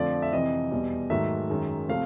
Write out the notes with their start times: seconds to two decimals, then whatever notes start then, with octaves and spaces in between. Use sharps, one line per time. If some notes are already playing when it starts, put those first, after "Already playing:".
Already playing: F2 D3 F3 A3 D5
0.22 E5
0.32 F2 C3 E3 D#5
0.71 E2 B2 G3
1.10 G#2 D#3 F#3 A3 E5
1.50 F#2 D#3 G#3
1.89 C3 F3 A3 F5